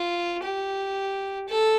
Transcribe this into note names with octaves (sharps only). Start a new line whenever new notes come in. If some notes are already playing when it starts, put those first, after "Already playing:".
Already playing: F4
G4
A4